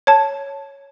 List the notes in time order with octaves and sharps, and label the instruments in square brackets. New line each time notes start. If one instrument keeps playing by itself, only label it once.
[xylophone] C#5 A5